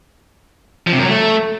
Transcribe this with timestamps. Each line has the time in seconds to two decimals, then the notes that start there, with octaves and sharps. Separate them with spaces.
0.87 F3
0.92 C3
0.98 F#2
1.03 F#3
1.09 A3